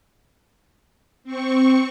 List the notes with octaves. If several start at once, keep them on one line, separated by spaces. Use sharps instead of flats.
C4 C#6